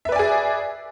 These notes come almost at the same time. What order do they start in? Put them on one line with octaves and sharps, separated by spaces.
E5 B4 D5 G#5 G#4